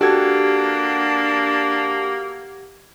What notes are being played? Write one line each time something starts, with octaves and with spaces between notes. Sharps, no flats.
A#3 D4 F#4 G4 A4 F#5 G#6